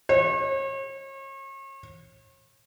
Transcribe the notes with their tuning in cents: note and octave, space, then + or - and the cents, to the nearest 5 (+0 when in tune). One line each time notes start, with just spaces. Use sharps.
C#5 -40